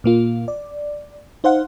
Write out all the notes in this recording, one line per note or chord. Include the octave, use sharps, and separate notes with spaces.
A#2 A#3 F4
D5
D#4 C5 F5 F#5